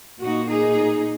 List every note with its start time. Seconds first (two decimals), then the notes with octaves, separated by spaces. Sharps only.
0.21 A#2 A#3 D#4 F#4
0.49 D#4 G#4